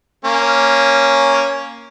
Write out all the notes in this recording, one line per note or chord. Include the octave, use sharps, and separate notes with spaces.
A#3 C#4